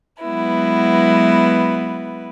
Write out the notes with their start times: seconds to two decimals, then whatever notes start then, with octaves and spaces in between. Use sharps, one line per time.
0.21 F#3 G#3 B3 E4 B4